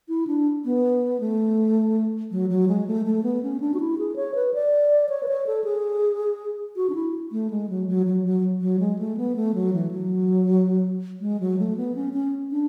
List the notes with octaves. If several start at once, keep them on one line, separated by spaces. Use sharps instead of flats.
E4
D4
B3
A3
F#3
F#3
G#3
A3
A3
B3
C#4
D4
F#4
E4
G#4
C#5
B4
D5
C#5
B4
C#5
A4
G#4
F#4
D4
E4
A3
G#3
F#3
F#3
F#3
F#3
F#3
G#3
A3
B3
A3
F#3
E3
F#3
G#3
F#3
A3
B3
C#4
C#4
D4